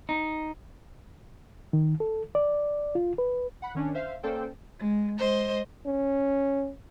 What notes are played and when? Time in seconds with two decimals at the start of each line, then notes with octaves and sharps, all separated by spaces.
0.09 D#4
1.73 D#3
2.00 A4
2.35 D5
2.95 F4
3.18 B4
3.62 F#5 B5
3.75 D#3 C#4 D4
3.94 C5 E5 F5
4.23 A#3 C#4 A4 C5 D5 G5
4.79 G#3
5.17 G#3 C5 D#5
5.86 C#4